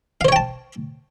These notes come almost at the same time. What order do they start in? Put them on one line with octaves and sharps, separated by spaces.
F5 C5 C#5 G5 A5